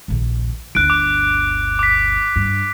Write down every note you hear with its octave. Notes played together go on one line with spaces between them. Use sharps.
D#1 A#1
G1 D2 F#6 D7
D6
D6 B6
G2